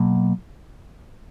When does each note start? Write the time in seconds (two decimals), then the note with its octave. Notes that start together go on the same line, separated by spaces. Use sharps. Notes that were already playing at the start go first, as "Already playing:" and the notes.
Already playing: B2 F#3 A#3